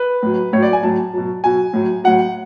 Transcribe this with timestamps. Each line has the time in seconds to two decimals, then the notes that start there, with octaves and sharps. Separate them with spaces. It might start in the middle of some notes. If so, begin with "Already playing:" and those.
Already playing: B4
0.23 A2 F#3
0.53 A2 C#5
0.58 F#3 D5
0.73 G#5
0.83 A2 F#3 A5
1.14 B2 F#3
1.44 B2 F#3 G#5
1.73 A2 F#3
2.04 A2 F#3 F#5